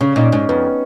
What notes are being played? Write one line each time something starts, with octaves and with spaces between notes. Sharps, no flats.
C#3 C#4
A#2 D#4
G#2 C#4
F2 B3